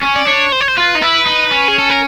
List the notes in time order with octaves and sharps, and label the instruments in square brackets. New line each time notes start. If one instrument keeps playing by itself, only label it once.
[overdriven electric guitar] C#4
[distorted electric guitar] D5
[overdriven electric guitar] D4 [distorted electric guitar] C#5
[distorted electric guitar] C5
C#5
C5
[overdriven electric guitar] F4 [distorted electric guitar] B4
[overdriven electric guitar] D#4
[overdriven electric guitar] E4 [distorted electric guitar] B4
[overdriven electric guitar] D#4
C#4
[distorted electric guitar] G#4
A4
A#4